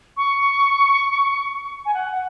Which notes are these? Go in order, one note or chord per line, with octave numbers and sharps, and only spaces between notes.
C#6
G#5
F#5
F#5